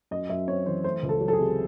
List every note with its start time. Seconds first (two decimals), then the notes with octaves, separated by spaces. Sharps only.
0.11 F#2 D#5
0.30 F#2 E5
0.48 C4 C#5
0.66 E3 C5
0.84 A3 C5
1.03 C#2
1.09 A4
1.21 F#3
1.28 A4
1.33 G#4
1.39 C3